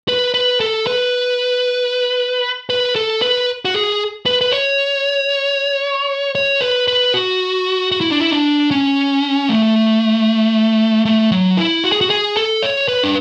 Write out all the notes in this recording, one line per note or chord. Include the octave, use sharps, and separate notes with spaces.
B4
B4
A4
B4
B4
A4
B4
F#4
G#4
B4
B4
C#5
C#5
B4
B4
F#4
F#4
E4
D4
E4
D4
C#4
A3
A3
F#3
E4
F#4
G#4
F#4
G#4
A4
C#5
B4
D4